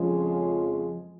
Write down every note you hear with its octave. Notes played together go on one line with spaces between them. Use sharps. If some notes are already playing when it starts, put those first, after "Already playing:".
Already playing: F2 C#3 F3 G#3 C#4 F4